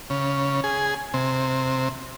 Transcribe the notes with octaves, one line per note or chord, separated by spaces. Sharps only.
C#3
G#4
C3